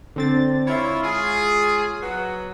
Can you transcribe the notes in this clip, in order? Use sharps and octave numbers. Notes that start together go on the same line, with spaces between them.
D3 C4 A6
E4 F4 C#5
G#3 F4 G#4
F#3 B3 F#4